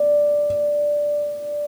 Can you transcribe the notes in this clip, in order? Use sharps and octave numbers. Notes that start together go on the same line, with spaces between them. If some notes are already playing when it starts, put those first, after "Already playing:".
Already playing: D5